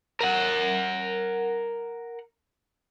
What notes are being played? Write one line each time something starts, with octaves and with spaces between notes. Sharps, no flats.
A#4 F#5